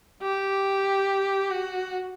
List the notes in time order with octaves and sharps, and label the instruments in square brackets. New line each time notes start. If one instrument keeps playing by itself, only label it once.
[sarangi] G4
F#4